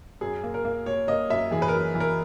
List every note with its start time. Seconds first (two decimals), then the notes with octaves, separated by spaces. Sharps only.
0.21 F#2 G#4
0.43 A#3
0.54 A#4
0.65 A#3
0.86 A#3 C#5
1.08 A#3 D#5
1.30 F#2 E5
1.51 E3 G#4
1.62 B4
1.68 A#4
1.73 F#2
1.95 E3
2.00 A#4